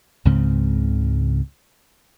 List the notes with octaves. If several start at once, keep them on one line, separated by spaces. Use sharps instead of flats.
C#2 G#2 C#3 C4